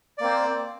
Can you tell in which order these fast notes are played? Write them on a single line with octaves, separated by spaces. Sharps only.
D5 A#3 C4 C5